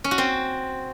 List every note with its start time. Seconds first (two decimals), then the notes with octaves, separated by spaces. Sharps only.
0.04 C#4
0.11 F#4
0.18 C4